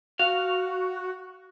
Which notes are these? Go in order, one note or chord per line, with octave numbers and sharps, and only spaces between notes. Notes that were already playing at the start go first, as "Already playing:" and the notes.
F#4 F5